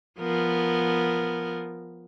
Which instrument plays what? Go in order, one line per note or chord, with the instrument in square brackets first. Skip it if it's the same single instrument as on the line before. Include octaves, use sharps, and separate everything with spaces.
[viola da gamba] F3 B3 A#4